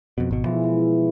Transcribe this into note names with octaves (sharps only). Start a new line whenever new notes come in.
F2 B2
G#1 B2
B2 E3 F3 G#3
E3